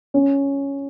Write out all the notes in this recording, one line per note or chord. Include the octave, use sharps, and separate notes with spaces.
C#4